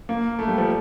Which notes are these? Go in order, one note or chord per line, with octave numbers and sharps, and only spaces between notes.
A#3
A3
G3
F3